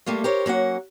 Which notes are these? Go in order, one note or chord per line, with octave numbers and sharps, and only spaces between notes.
G3 A3 A#3 F4
G4 A#4 C5 C#5
F#3 A#3 C#4 F#5